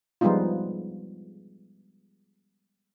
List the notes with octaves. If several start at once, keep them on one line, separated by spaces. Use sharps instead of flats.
F3 G3 G#3 B3 D#4 F4